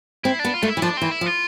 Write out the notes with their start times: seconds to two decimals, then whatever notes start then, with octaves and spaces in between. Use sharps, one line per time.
0.24 C4 E4
0.39 D4
0.45 B3
0.54 F4
0.62 A3 D4
0.68 E4
0.77 E3
0.82 F3 D4
0.97 E3 C4
1.11 E4
1.21 F3
1.26 F4